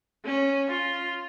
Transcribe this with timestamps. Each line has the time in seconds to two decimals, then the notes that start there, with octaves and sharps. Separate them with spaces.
0.25 C#4
0.70 F4